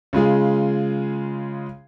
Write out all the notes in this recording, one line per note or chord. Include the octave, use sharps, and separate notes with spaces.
C#3 G#3 F4 G#4